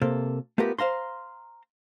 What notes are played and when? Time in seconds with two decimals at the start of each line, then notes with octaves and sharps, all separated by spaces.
0.02 C3 A#3 A4
0.58 A3 B3 F4 G4 A#4
0.78 C5 F5 A#5 C6